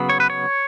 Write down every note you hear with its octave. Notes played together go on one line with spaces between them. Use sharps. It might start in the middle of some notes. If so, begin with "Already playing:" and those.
Already playing: C#3 F#3 B3
C#5
B4
C#5